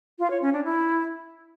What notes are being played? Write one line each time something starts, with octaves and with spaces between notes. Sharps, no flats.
F4
C#5
C#4
D4
E4